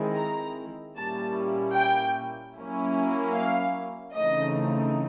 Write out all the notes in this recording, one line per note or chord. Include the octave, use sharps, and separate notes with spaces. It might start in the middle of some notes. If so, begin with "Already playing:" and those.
Already playing: D#3 G#3 C4 E4
A#5
A#2 G3 A#3 C#4 E4 A5
G5
F#3 A#3 C#4 E4
F5
C#3 E3 A3 C4 D#4 D#5